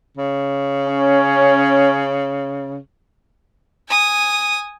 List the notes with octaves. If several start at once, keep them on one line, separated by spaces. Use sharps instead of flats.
C#3
C#4
G#5 D#6